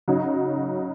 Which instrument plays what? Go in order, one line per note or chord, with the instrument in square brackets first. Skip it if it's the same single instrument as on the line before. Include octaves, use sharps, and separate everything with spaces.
[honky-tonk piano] C#3 F#3 D#4